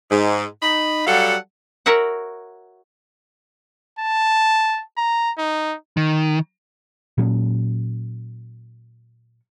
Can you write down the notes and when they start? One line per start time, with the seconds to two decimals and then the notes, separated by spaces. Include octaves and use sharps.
0.11 G#2
0.62 D#4 B5
1.07 F#3 G3 A4 F5 F#5
1.86 F#4 A#4 C#5 E5 F#5
3.99 A5
4.97 A#5
5.38 D#4
5.97 D#3
7.18 A#2 F#3 C#4